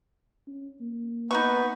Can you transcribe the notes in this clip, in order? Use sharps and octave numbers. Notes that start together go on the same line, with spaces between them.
C#4
A#3
B3 D#4 F#4 B4 C#6